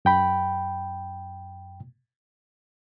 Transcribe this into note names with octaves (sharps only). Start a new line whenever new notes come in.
F#2 G5 B5